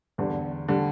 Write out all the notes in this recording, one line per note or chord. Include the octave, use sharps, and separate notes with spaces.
E2 D3 G3
D3 G3